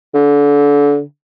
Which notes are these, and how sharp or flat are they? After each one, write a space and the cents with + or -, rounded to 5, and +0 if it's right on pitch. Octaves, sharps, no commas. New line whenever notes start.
D3 -30